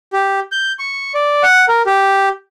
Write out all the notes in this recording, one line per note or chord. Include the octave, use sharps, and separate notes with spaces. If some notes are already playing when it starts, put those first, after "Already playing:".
G4
G6
C#6
D5
F#5
A#4
G4